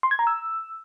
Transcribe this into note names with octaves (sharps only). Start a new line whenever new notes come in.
C6
G#6
A#5
E6